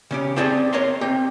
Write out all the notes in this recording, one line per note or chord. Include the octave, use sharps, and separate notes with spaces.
C#3 C#4 G4
C4 G4 G#4 D5 E5 A5
A#4 C#5 D#5 F5 A#5 C6
C4 G4